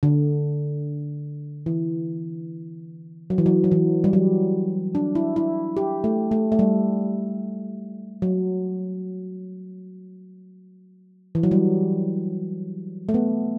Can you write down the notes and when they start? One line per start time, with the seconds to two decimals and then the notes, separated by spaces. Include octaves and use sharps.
0.03 D3
1.66 E3
3.30 F#3
3.38 E3
3.46 F#3
3.64 F#3
3.72 E3
4.04 G3
4.13 F#3
4.95 D4
5.15 E4
5.36 E4
5.77 G4
6.04 A3
6.31 A3
6.52 A3
6.59 G3
8.22 F#3
11.35 E3
11.43 F#3
11.51 G3
13.09 A3
13.14 B3